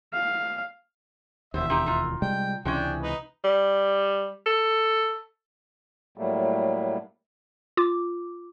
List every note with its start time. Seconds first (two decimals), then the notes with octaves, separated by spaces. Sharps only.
0.13 F5
1.54 E1 D#2 B3 C5 E5
1.70 C4 D#4 G4
1.86 D#4 F4
2.22 C3 G3 G#3 G5
2.65 C#2 C3 E3 G#3 C#4 D4 G5
3.02 D#4 B4
3.44 G3
4.46 A4
6.18 A2 F#3 G3 A3 A#3
7.77 F4 D6